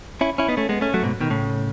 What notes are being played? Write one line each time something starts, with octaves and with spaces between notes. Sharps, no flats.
C#4 E4
C#4 E4
B3 D#4
A3 C#4
G#3 B3
A3 C#4
F#3 A3
G#2 B2
B2 D#3
A2 C#3